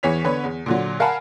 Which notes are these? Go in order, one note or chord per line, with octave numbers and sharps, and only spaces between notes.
E2 E3 C#5 B6 F7
D3 B3 B4 C#5
E2
A#2 D3 F#3
A#4 F5 F#5 G#5 A5 B5